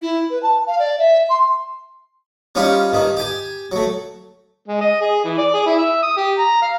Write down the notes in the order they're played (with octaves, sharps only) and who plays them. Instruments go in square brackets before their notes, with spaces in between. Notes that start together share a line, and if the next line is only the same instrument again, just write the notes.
[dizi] E4
B4
A5
F5
D5
E5
C6
[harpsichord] G3 C#4 D#4 F4 G4
G2 D#3 D#4
G4 G#5
F#3 A3
[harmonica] G#3
D#5
G#4
E3
D5
G#4
E4
E5
D#6
G4
A#5
F5